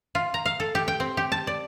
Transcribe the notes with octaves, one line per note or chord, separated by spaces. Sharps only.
F4
A#5
F5
A4
G4
G5
C4
G4
A5
D5